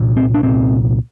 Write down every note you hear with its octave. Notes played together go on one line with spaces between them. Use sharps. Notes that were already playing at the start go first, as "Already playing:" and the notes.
Already playing: C2 A#2
C4
D4
C2 A#2 C4